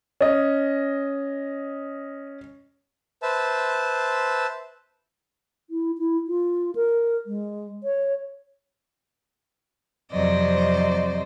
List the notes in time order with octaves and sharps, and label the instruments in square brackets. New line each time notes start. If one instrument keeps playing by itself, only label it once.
[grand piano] C#4 D#5
[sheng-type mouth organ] B4 C5 E5 A5
[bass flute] E4
E4
F4
A#4
G#3
C#5
[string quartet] F2 C3 F#3 C5 D5 D#5